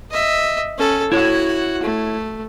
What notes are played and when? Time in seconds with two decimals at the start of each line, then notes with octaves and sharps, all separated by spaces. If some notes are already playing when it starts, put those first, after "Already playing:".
0.11 D#5 E5
0.78 C#4 A4
1.12 E4 F#4 C#5 F#5
1.83 A3